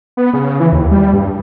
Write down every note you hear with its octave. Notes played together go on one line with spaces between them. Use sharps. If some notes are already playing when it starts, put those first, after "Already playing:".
B3
C#3
E3
D#2
G3
G2